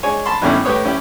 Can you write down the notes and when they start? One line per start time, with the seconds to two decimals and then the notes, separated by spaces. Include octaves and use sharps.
0.03 G#3 D4 C#5 G#5
0.26 A5 B5 C6
0.41 G2 B2 D#3 A3 C#4 E4
0.64 A2 G4 B4 C#5 D#6
0.85 C#4 E4 G4